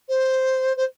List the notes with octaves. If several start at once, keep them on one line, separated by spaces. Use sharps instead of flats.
C5
C5